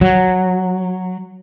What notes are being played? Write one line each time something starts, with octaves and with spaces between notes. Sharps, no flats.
F#3